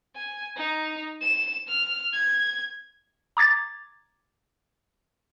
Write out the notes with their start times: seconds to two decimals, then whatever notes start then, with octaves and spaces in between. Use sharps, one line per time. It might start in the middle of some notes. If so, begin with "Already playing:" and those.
0.16 G#5
0.57 D#4
1.21 E7
1.68 F6
2.13 G#6
3.37 A#5 D6 G#6 A6